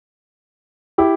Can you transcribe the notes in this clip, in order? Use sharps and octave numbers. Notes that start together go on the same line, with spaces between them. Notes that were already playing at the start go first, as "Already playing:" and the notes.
E4 G4